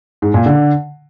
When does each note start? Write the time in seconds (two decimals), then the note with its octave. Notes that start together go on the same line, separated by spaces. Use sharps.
0.22 G#2
0.34 A#2
0.46 D3